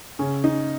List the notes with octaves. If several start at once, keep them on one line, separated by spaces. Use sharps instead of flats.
C#3 C#4
D#4